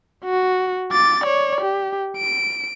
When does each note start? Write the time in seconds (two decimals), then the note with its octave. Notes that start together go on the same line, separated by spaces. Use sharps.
0.25 F#4
0.92 D6 A6
1.24 C#5 D5
1.61 G4
2.17 D7